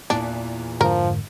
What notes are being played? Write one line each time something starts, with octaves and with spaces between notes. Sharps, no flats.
E2 A#2 E3 D4
F2 G#2 D3 F3 A#4